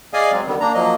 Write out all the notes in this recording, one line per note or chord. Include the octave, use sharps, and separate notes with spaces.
G#4 D5 D#5 F5 G#5 D#6
F#3 G#3 C4
D3 D#3 G3 B3
A#3 D4 A#5
F3 F#3 A#3 D#5